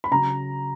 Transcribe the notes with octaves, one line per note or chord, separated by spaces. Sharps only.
B5
C#3 F#3 A#5